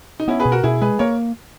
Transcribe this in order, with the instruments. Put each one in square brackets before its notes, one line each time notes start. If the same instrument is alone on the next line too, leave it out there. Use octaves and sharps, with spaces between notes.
[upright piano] D#4
[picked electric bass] B3 [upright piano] C#4 E4
[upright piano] G#4 B4
[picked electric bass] B2
[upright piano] F#4 A#4
[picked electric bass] B2 [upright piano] E4 G#4
[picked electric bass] G#3 [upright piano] G#4 B4
[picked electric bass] A#3 [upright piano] A#4 C#5